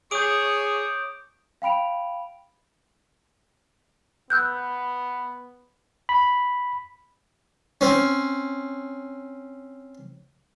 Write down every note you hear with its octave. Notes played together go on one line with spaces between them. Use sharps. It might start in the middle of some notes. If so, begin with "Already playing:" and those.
G#4 C#5 D6 D#6 G6 D7
F5 G5 B5 D7 F7
B3 E6 F#6 G6
B5
C4 C#4